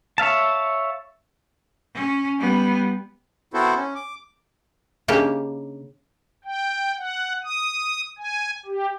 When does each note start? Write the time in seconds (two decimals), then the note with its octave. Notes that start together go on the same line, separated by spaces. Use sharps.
0.18 C#5 E5 F5 A5
1.95 C#4
2.38 G3 B3
3.54 B3 C4 E4 F#4 A4 C5
3.76 C#4
3.95 D6
5.08 C#3 A#3 D4 D#4 G4
6.45 G5
6.97 F#5
7.44 D#6
8.18 G#5
8.66 G4